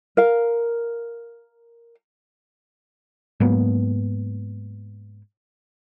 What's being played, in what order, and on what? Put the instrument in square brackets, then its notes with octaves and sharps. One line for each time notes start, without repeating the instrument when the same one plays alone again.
[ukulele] A#4 F5
[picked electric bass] G#2 F#3 A#3 B3